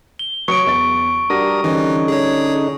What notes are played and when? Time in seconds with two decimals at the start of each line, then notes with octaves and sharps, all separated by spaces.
0.19 G7
0.48 F#3 C#6 D#6 C#7 D7
0.67 E2 A6
1.30 G3 D4 F#4 A#4 D#6 A#6
1.64 D3 E3 C#4 D#4
2.08 G#4 C#5